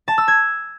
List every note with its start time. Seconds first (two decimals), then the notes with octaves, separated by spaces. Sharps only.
0.08 A5
0.18 E6
0.28 G#6